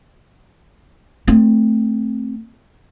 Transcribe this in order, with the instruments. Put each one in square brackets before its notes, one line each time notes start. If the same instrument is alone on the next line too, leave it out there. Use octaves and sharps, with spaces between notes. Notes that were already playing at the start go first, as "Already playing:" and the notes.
[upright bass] A3 C4